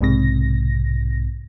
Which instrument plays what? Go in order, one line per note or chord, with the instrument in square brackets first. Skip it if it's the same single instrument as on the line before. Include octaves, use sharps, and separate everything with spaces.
[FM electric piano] B1 G#2 C3 A#6